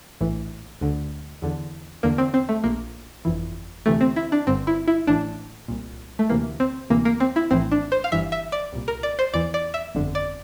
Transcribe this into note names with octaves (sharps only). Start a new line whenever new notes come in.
A#1 A2 E3
D2 D3
E2 D3
E2 D3 A#3
C4
C4
A3
A#1 A#2 A#3
G1 F2 E3
D2 C3 E3 A3
C4
E4
D4
G1 G2 D3 C4
E4
E4
A1 A2 E3 D4
C2 A#2
A3
D2 C3 E3 A#3
C4
D2 C3 E3 A#3
A#3
C4
E4
A#1 A2 E3 C4
D4
C5
F5
G1 G2 E3 E5
E5
D5
C2 A#2
A#4
D5
C5
E2 E3 D5
D5
E5
G1 F2 D3
D5